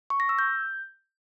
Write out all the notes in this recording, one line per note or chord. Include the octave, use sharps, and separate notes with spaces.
C#6
A#6
E6
G6